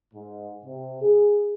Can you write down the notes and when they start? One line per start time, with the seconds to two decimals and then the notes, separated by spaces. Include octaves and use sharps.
0.14 G#2
0.65 C3
1.01 G#4